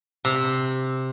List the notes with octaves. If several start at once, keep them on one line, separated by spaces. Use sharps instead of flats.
C3